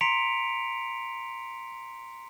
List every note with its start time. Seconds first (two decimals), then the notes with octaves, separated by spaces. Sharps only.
0.01 A#5 C6 B6 C#7 D7 F7